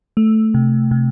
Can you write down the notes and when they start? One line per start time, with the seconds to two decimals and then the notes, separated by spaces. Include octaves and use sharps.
0.17 A3
0.54 C3
0.91 C3